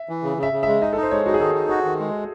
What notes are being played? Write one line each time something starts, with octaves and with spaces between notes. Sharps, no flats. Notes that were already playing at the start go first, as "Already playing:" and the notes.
Already playing: E5
E3
C#3
C#3
E5
C#3
G#3 E5
D#4 D#5
D#4 A4
C5
G#3 C#5
D#4 F#4
G#4
D#3 A4
D#4
F#4 G#4
D#3
G#3